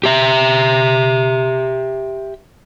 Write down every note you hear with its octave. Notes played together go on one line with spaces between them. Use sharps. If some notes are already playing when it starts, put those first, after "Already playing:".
G4 E5